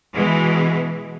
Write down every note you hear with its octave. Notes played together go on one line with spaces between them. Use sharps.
B2 E3 G#3